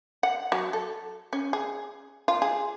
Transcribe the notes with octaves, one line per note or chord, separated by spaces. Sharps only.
F#5
F#3
A4
C#4
G#4
F4
G#4